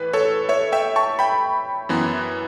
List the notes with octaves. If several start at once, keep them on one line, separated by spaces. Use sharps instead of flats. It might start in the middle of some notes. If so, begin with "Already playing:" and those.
Already playing: A2 E3 B4
A4 C#5
C#5 E5
E5 G5
A5 C#6
G5 B5
F#2 E3 B3